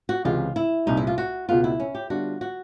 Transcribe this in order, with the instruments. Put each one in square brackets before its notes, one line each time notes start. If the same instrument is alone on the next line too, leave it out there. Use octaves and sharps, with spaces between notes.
[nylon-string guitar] F#4
[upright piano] C#2 C3 E3 G#3 [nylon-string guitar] F4
[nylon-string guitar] E4
[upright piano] C2 A#2 G3 [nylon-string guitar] D#4
[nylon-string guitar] E4
F4
F#4
[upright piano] C#2 B2 G#3 B3 [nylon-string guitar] F4
[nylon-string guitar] E4
C#4
G4
[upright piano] D3 G3 B3 D4 F4 [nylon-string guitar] F#4
[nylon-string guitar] F#4